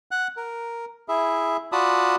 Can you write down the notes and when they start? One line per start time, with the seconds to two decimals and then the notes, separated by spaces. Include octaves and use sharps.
0.11 F#5 F#6
0.37 A#4
1.08 E4 G#4 E5
1.72 F4 F#4 D5 A5 B5 D#6